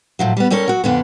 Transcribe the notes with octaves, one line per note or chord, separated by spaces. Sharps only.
A2 F3 F#3
G3 B3
G3 C#4 A4 A#4 C#5
F#3 F#4
F2 D3 B3